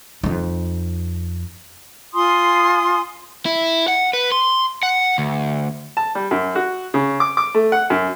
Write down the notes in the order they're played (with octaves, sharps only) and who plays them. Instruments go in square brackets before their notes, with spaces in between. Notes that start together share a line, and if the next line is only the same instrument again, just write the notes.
[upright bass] F2 D#4
[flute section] F4 G#5 C6 D#6
[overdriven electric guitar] E4
F#5
B4
C6
F#5
D2
[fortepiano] A5
G3
F#2
F#4
C#3
D6
D6
A3
F#5
F#2